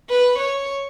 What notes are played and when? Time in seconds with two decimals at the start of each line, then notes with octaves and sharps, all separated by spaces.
0.10 B4
0.38 C#5